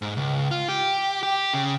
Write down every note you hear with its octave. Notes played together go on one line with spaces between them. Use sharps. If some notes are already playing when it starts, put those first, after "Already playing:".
G#2
C#2
F4
G4
G4
C#3